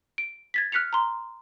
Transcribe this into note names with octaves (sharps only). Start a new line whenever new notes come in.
D7
G#6 A6 B6
F6 F#6 B6 C#7 F7
A#5 C6